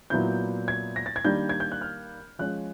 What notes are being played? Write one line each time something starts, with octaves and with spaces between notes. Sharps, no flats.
A#2 F#3 B3 E4 G6
G#6
A#6
A6
G#6
D#3 G3 A#3 D4 G6
G#6
G6
F#6
F6
F3 G#3 C#4 F#6